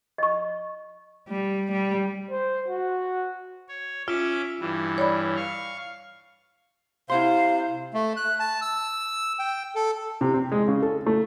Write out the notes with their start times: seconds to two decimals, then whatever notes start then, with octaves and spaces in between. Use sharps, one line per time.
0.18 D#5 C#6
1.29 G3
1.72 G3
2.30 C5
2.68 F#4
3.69 C#5
4.08 C#4 F4 E5 D6
4.60 G2 E3
4.98 C#5 D5 B5
5.36 F5 C#6
7.10 C3 E4 C5 F5 F#5 C6
7.94 A3
8.17 F#6
8.40 A5
8.62 E6
9.39 G5
9.75 A4
10.21 C3
10.34 C4
10.52 G#3
10.68 C#3
10.82 A4
11.06 A3